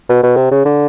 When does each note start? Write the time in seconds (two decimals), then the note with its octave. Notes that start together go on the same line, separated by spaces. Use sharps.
0.09 B2
0.23 B2
0.37 C3
0.51 C#3
0.65 D3